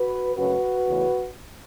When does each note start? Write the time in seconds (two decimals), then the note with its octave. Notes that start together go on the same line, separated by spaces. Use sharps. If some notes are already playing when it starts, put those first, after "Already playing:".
Already playing: F#4 B4
0.36 F#2 C#3 A3 C#4 F#4 B4
0.87 E2 C#3 E3 A3 C#4